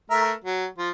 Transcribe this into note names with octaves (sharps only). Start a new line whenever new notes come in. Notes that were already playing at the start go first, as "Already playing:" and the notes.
A3 A#4 E5
F#3
F3 F4